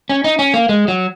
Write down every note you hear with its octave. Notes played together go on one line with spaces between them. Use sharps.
C#4
D#4
C#4
A#3
G#3
F#3